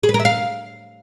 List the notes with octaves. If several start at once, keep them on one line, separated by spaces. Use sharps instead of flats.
G#4
B4
A#4
E5
F5